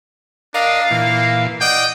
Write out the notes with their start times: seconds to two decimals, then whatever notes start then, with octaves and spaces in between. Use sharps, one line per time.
0.54 D4 A#4 D5 D#5 F5
0.91 A#2 E3 A#3
1.61 D5 D#5 F#5 G5